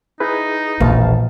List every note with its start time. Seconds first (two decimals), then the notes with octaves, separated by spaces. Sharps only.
0.20 D#4 E4 G#4 B4
0.80 E1 A#1 A#2 F5 A5